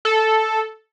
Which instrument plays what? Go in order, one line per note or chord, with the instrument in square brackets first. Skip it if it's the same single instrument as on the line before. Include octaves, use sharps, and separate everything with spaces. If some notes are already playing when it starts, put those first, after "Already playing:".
[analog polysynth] A4